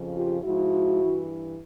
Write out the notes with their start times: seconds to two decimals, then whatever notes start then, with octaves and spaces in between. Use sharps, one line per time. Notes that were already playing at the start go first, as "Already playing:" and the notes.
Already playing: F2 C#3 F3
0.14 F4 G4
0.43 G#2 F3 E4 F#4
1.00 G2 E3